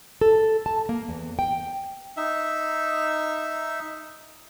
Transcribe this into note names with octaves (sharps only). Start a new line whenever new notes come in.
A4
A5
A#3
E2
G5
D#4 E5